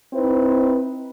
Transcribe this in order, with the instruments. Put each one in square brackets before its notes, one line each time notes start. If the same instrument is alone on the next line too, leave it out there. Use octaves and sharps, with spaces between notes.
[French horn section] C4 D#4 E4 B4 C5